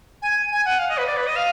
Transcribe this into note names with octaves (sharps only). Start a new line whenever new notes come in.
G#5
G#5
F#5
F5
D#5
B4
D5
B4
D#5
F5